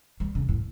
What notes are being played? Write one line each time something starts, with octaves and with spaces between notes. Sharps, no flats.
G3
C#3
A2